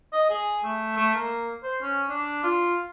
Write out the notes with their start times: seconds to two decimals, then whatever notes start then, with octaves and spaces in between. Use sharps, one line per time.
0.13 D#5
0.30 G#4
0.64 A3
0.96 A3
1.14 A#3
1.63 C5
1.81 C#4
2.09 D4
2.43 F4